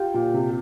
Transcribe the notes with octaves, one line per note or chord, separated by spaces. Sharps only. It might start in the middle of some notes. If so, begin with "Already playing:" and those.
Already playing: F4 G4
A#2
C3